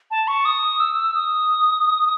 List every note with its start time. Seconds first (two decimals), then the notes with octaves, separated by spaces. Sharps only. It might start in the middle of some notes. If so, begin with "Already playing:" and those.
0.11 A5
0.28 C#6
0.45 D#6
0.80 E6
1.15 D#6